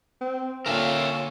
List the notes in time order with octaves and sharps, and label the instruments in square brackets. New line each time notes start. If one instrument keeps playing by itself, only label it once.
[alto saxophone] C4
[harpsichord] A#2 D3 [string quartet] F4 C#5 G5 [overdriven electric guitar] A#4 E5 [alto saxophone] F5